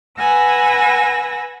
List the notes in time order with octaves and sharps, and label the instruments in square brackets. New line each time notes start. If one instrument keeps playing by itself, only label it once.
[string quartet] B4 F#5 G#5 E6 A#6